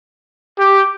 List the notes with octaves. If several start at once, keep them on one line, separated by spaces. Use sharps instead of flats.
G4